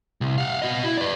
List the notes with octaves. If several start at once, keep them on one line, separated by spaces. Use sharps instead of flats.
C2
F5 F#5
F#4 D#5
E4
B4 D5